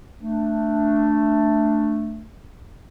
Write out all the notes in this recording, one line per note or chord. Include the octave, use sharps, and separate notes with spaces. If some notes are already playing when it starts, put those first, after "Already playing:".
A3 D4